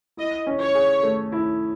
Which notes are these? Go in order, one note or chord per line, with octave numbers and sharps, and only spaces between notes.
E4 D#5
C#4
C#5
G#4
A3
E4